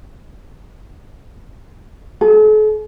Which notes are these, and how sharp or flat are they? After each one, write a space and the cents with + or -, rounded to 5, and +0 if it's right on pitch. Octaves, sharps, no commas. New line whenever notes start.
A4 -45